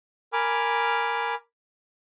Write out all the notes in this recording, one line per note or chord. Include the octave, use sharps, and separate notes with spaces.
A#4 G#5 B5 D6 F6